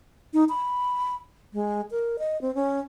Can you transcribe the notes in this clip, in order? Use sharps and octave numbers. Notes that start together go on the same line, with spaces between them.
D#4
B5
G#3
A#4
D#5
C4
C#4